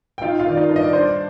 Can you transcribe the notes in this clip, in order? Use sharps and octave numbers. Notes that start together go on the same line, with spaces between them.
G5
D#4 F4 F5
F4 F5
D#3 D5
D#4 D#5
G2
D#5
D5
D4 C5
D5